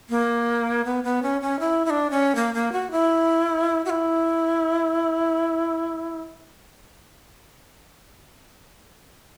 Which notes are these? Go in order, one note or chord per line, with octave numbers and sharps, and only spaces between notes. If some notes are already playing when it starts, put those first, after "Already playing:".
A#3
B3
B3
C#4
C#4
E4
E4
D4
C#4
A#3
A#3
F#4
E4
F#4
E4